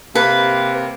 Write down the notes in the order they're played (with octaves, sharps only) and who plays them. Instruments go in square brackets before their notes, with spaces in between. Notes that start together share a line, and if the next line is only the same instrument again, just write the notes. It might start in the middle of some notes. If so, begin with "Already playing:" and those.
[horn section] C3 A#3 [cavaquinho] B4